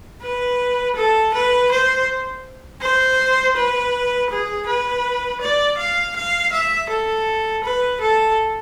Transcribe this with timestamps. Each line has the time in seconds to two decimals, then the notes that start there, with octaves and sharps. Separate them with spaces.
0.22 B4
0.96 A4
1.34 B4
1.71 C5
2.81 C5
3.56 B4
4.30 G#4
4.67 B4
5.41 D5
5.78 F5
6.16 F5
6.52 E5
6.89 A4
7.63 B4
8.01 A4